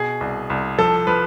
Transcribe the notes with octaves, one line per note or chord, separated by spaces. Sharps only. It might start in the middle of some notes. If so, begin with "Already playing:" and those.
Already playing: B2 G#4
C2
C2
F3 A4
F3 B4